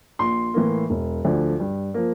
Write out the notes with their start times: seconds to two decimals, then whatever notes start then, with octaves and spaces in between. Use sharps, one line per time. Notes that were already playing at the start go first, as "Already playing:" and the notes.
0.19 A#1 C6
0.54 A2 E3 A#3
0.90 E1
1.24 D2 D3 F3
1.60 G2
1.94 F3 A#3